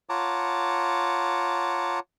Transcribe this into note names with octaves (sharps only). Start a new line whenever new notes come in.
F4 C#5 F#5 A5 A#5 D6